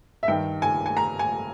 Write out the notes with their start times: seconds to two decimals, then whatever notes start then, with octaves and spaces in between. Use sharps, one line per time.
0.23 E5
0.28 G2 D#3 G5
0.62 G#5
0.86 G#5
0.97 A#5
1.19 G#5